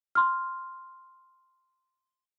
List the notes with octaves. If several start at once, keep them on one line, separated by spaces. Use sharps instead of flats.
C6 F6